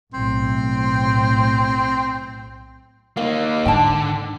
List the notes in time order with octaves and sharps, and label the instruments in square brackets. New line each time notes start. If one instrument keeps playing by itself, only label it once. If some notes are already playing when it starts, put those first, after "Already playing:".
[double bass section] B1 A2 [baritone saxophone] C4
[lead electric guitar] A#3 D#4 [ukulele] F5
[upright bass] G#2 [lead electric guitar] D3 [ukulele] G5 A5